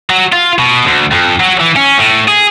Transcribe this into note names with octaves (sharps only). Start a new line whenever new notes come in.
F#3
F4
B2
D2
F2
F#3
E3
C#4
A2
G#4